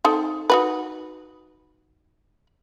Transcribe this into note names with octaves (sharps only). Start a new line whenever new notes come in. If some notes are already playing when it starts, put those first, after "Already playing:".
C4 D#4 A4
D#4 F#4 B4